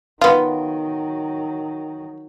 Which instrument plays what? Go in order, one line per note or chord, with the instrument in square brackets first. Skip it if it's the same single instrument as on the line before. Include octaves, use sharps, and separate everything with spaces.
[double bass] D#3 F#3 [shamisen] B3 F4